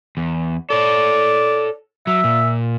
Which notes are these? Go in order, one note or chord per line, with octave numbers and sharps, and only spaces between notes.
E2
A4 C#5 D5
F#3 E5
A#2